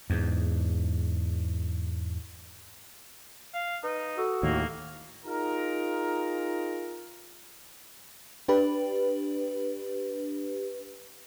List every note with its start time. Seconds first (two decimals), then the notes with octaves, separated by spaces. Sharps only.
0.10 E2 G#2
3.54 F5
3.83 D#4 B4
4.18 F#4 A4 D#6 E6
4.43 D#2 A2 A#3
5.25 D#4 F4 G#4 A#4
8.48 D4 G4 B4